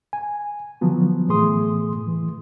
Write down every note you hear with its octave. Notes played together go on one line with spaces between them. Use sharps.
G#5
D3 F3 F#3 B3
A2 E3 A3 G#4 C6 D#6
E3